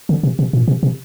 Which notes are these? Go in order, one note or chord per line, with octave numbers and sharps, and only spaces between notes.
D3
C3
C3
A#2
C3
C3